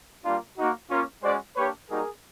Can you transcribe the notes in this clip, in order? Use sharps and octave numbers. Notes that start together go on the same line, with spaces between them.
G3 A#3 D4 F4
A#3 D#4 F#4
A#3 C#4 F4
G#3 C#4 F#4 C5 D5
A#3 D4 G4 B4 C#5
G3 A#3 D#4 F#4 G#4 A#4